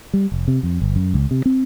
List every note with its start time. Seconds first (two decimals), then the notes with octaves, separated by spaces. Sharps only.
0.13 G3
0.32 F1
0.48 C3
0.63 F2
0.82 G1
0.96 F#2
1.14 C#2
1.31 C3
1.46 C4